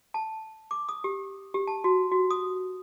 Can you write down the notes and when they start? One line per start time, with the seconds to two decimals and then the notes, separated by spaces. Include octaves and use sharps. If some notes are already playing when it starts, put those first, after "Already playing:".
0.14 A5
0.71 D6
0.89 D#6
1.04 G4
1.54 G4
1.67 A5
1.84 F#4
2.12 F#4
2.31 D#6